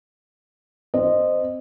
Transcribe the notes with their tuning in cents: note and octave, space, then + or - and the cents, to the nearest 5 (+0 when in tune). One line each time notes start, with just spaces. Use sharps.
C4 -10 D#5 -20